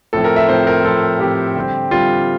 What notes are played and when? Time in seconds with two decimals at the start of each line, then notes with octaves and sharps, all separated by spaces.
0.13 A2 F3 C4 A4
0.24 A#4
0.36 E5
0.49 A2 F3 C4 C5
0.67 A#4
0.84 A2 F3 C4 A4
1.20 A2 F3 C4 G4
1.56 D3 G3 C4
1.91 D3 G3 C4 F4